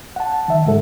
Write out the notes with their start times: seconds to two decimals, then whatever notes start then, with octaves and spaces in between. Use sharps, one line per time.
0.16 F#5 A5
0.48 D#3 E5
0.66 G#2 C#3 G#3 A4